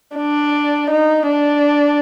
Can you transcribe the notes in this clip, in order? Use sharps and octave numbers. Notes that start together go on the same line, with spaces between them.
D4
D#4
D4